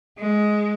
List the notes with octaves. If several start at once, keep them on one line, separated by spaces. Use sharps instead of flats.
G#3